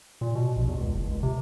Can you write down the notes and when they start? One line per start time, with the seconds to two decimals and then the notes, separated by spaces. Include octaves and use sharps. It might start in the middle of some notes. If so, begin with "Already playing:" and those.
0.21 A#2
0.35 B2
0.56 A#1
0.68 E2
0.80 C#2
0.94 F#1
1.11 C#2
1.23 C3